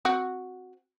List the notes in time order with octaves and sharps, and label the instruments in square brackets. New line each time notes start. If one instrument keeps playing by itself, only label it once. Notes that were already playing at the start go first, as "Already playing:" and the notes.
[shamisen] C4 F#4 F#5